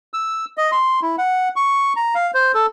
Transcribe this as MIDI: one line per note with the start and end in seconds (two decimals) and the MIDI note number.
0.14 0.45 88
0.58 0.71 75
0.72 1.00 84
1.02 1.16 64
1.18 1.49 78
1.56 1.93 85
1.96 2.14 82
2.15 2.31 77
2.34 2.52 72
2.55 2.66 69